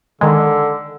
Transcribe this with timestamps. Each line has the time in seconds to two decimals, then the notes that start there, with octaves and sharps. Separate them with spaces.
0.21 D3 D#3 G#3